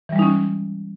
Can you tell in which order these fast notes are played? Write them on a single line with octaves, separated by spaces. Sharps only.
E3 G3 G#3 D#4 C#4